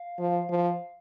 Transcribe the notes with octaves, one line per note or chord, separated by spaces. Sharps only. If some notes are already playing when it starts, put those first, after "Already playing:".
Already playing: F5
F3
F3